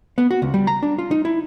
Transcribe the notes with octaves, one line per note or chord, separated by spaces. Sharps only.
B3
F#4
C#2
G3
A#5
D4
F4
D#4
E4